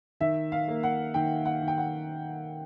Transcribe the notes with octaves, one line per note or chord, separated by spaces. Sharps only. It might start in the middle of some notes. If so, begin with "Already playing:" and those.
D#3 E5
F5
A#3
F#5
D#3 G5
F#5
D#3
G5
F#5